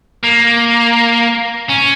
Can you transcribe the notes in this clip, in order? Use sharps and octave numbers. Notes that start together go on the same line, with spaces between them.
A#3
C#4